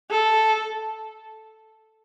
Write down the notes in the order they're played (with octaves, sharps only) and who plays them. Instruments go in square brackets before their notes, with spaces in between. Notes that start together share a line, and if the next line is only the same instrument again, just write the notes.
[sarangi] A4